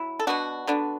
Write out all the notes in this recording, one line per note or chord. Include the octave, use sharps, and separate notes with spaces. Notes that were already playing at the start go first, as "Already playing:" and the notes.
Already playing: F#3 E4
A4
B2 B3 D4 F#4
D3 B3 D4